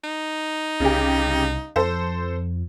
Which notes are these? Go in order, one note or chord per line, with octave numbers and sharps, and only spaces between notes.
D#4
C2 C#3 G4
F2 A4 C5